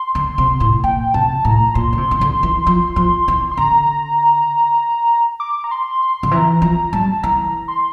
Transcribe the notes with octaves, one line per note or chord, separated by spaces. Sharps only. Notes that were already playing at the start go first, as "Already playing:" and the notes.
Already playing: C6
D3
C3
A2
A#2 G5
C3 A5
A2 A#5
A#2 C6
D3
C3
E3
D3
E3
F3
F3
E3
C6
D3 A#5
D6
A#5
C6
C6
D3
E3 A#5
F3 A#5
G3 A5
E3 A#5
C6